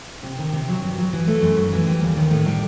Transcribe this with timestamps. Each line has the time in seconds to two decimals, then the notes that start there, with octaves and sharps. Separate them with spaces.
0.23 C3
0.39 D#3
0.53 C3
0.68 F#3
0.82 G2
0.98 F#3
1.13 E3
1.27 A3
1.42 F#2
1.56 F#3
1.73 E3
1.87 G3
2.01 D#2
2.17 D#3
2.31 A2
2.46 G3